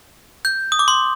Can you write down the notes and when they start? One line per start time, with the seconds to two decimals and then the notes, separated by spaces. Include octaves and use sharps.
0.45 G6
0.72 D#6
0.79 D6
0.88 C6